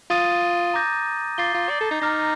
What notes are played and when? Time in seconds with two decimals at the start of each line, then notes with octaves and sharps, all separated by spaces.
0.10 F4 D#6 A6 D#7
0.74 A#5 D6 G6 A#6
1.38 F4 D6 A6 C7 G7
1.54 F4
1.70 D5
1.81 A4
1.91 D#4
2.01 D#4 A#5 D6 F6 A#6